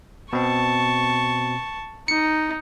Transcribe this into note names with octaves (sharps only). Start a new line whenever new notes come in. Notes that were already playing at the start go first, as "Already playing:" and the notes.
B2 C4 A5 C#6
D#4 C#7